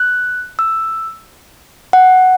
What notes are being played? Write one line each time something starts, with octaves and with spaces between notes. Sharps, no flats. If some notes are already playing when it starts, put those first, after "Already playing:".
Already playing: F#6
E6
F#5